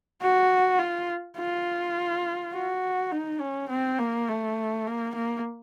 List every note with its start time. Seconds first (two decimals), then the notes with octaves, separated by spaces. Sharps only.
0.22 F#4
0.79 F4
1.37 F4
2.54 F#4
3.12 D#4
3.40 C#4
3.70 C4
3.99 A#3
4.28 A3
4.87 A#3
5.15 A#3